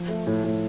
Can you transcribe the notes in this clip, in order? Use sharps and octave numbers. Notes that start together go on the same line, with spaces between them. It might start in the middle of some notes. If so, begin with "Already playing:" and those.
Already playing: F3
A3
A2
A2